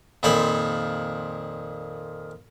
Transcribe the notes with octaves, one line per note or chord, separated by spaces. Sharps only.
F2 A#2 D#3 C5 C#5 B5